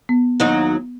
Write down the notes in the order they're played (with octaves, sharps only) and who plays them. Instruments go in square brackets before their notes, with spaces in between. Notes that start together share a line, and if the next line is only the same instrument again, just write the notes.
[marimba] B3
[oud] D#2 F#3 D#4